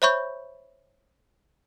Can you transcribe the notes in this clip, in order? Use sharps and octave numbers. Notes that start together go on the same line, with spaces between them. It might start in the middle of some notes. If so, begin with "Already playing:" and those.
C5 C#5 E5 B5 C#6 G6